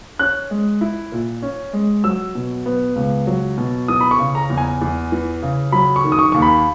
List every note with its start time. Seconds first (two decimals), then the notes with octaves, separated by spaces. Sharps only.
0.19 C#4 F#6
0.51 G#3
0.81 E4
1.12 A#2
1.42 C#4
1.73 G#3
2.04 F#3 E6
2.35 B2
2.66 B3
2.96 C#2
3.27 F#3
3.58 B2
3.88 E3 D#6
4.01 B5
4.11 C#6
4.19 C#3
4.35 A#5
4.50 E2
4.57 G#5
4.81 E2
5.12 E3
5.42 C#3
5.72 F#3 B5
5.96 C#6
6.04 D#3
6.12 D#6
6.19 C#6
6.32 D#2 C#6
6.42 B5